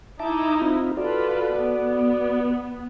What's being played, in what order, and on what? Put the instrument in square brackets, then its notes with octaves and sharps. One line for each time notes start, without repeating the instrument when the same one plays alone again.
[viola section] D#4 E4 [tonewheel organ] E5 A5 D6
[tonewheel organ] C4 F4
[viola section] F4 A4 B4 [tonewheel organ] F#4 D5
[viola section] B3